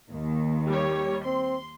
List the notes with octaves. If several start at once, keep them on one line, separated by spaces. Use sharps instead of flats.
D#2 D#3
G3 G4 C#5
C4 C6